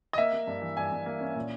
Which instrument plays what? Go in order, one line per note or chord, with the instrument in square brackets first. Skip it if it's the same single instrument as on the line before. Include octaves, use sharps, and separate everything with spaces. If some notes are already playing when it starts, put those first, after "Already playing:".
[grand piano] D#5
A#3 E5
A#3
G2
E3
G2 G#5
G2
A#3
C#4
A#2